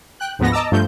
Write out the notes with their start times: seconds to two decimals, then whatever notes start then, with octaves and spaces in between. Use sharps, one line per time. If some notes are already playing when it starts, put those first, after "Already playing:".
0.20 G5 F#6
0.39 D2 G#2 F3 B3 A#6
0.52 D#5 A5 A#5 D6 E6
0.72 G2 F3 A3 G6